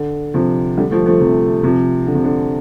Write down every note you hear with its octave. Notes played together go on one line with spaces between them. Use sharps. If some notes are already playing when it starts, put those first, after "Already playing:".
Already playing: D3
C3 F3
D3 G3
F3 A3
F3 A3
C3 F3
C3 F3
D3
C3
D3